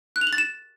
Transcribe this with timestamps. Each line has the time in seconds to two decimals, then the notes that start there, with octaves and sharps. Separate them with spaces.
0.16 F#6
0.21 F7
0.27 F#7
0.33 A6
0.38 E7